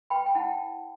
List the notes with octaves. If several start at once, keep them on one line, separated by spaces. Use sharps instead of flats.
B4 G5 B5
G5
E4 F#5 A5